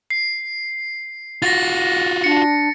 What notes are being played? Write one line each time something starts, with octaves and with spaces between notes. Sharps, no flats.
C7
F4 F#4 A6 A#6
D4 C#7